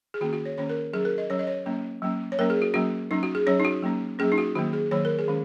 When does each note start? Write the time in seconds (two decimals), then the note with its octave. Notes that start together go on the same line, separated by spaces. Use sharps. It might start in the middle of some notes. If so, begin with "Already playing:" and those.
0.14 G#4
0.21 D#3 A#3 C#4 F#4
0.33 F#4
0.45 C#5
0.58 D#3 A#3 C#4 C#5
0.69 A#4
0.93 F#3 C#4 G#4
1.05 A#4
1.18 D#5
1.30 F#3 C#4 C#5
1.39 D#5
1.47 C#5
1.66 F#3 A#3 C#4
2.02 F#3 A#3 C#4
2.32 C#5
2.39 F#3 A#3 C#4 A#4
2.50 G#4
2.62 F#4
2.74 F#3 A#3 C#4 F#4
3.11 F#3 C#4 D#4
3.23 F#4
3.35 G#4
3.47 F#3 C#4 C#5
3.60 D#4
3.65 F#4
3.82 F#3 A#3 C#4
4.19 F#3 A#3 C#4 G#4
4.32 D#4
4.38 F#4
4.55 D#3 F#3 A#3 F#4
4.73 G#4
4.91 D#3 F#3 A#3 C#5
5.05 A#4
5.19 G#4
5.28 D#3 G#3 C#4